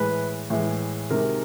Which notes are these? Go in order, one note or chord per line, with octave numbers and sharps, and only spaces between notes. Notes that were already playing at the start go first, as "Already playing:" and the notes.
Already playing: A2 E3 G#3 B4
A2 E3 G#3
C3 D#3 G#3 A#4